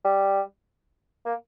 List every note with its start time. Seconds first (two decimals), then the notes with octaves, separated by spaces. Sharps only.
0.05 G3
1.25 A#3